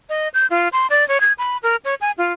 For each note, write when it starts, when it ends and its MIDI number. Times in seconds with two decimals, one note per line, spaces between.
0.09 0.28 75
0.34 0.46 91
0.50 0.68 65
0.73 0.87 84
0.90 1.07 74
1.08 1.20 73
1.21 1.33 92
1.38 1.57 83
1.63 1.76 70
1.85 1.95 73
2.01 2.11 80
2.18 2.33 65